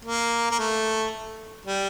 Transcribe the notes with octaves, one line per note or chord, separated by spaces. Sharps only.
A#3
A#3
A3
G3